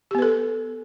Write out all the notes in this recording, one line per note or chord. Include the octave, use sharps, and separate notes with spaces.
B3 G4 A4 B4